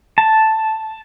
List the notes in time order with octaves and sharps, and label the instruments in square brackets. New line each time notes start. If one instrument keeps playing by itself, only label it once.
[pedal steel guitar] A5